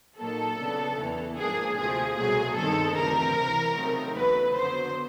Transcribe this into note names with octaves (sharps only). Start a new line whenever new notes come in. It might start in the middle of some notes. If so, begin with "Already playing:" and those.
A#2 F#3 A#3 D#4 A4
C#3 F#3 B3 D4
E2 C#3 E3
G#2 F3 A#3 D4 G#4
D2 C3 F3 A3 G#4
C2 B2 F#3 A3 G#4
G2 D#3 G#3 C4 D#4 A4
D2 C#3 E3 G3 C4 A#4
C2 C3 E3
C#3 F#3 A3 C4 D#4
E2 C#3 F#3 A3 B4
F2 D3 F#3 B3 C5